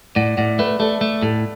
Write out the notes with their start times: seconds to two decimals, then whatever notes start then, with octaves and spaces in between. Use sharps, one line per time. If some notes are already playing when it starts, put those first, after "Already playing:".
0.15 A2 D5 F#5
0.37 A2 D5 F#5
0.59 A3 B4 E5
0.79 A3 A4 D5
1.01 A3
1.22 A2 A4